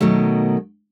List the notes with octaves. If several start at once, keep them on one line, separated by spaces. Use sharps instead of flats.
B2 D#3 F#3 A3